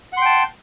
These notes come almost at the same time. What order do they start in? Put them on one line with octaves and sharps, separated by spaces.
F#5 C6 G5 A5